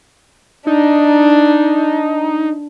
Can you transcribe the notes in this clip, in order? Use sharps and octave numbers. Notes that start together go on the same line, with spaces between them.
D4 D#4